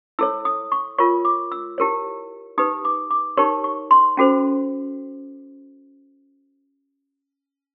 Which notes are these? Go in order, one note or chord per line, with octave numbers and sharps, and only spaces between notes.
E4 A4 C#5 E6
D#6
C#6
F4 A#4 C#5 C#6
D6
E6
E4 G4 A#4 C#5
D#4 G4 B4 D#6
D6
D6
D#4 G4 A#4 C#5 C#6
C#6
C6
C#4 F#4 A4 C5